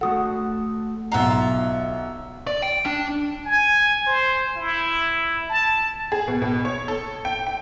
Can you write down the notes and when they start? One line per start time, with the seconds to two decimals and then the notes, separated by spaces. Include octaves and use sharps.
0.01 A3 F#4 A4 F#5 D#6
1.12 B1 F4 E5 F#5 A#5
2.47 D5
2.62 G5
2.86 D4
3.46 G#5
4.06 C5
4.56 E4
5.49 A5
6.12 G#4
6.28 B2
6.42 B2
6.65 C#5
6.88 A4
7.25 G5
7.47 G5